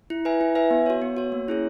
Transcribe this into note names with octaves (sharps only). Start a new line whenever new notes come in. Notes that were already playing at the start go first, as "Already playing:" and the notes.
E4
B4 E5 G#5
E4
B4 E5 G#5
B3
F#4 C#5
B3
F#4 C#5
A#3
C#4 E4 G#4 C#5